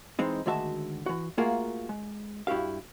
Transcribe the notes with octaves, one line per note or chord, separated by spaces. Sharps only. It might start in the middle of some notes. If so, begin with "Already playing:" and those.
E3 G#3 C4 D#4
D2 D#3 G#3 F#4 E5 A5
E3 F#4
A3 A#3 F4 F#4 G#4 A#4
G#3
G2 E4 F#4 G4 F5